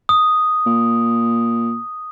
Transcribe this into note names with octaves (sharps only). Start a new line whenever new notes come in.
D#6
A#2